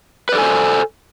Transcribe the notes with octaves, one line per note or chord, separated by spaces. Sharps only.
A4 B4 C5 D5 G#5